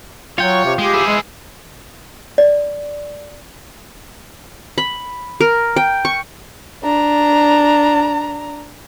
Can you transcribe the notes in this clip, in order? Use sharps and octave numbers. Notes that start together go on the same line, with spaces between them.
F#3 F4 C#5 G5
C3
G#3 G4
E4 G#4
G#3
D5
B5
A#4
G5
C#6
D4 A#5